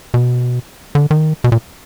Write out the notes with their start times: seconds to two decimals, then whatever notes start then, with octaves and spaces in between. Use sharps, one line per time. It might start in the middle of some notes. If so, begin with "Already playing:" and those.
0.14 B2
0.95 D3
1.11 D#3
1.44 B2
1.52 A#2